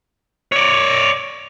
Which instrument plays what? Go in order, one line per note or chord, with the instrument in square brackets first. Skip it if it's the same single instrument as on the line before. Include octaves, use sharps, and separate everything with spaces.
[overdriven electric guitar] C#5 D5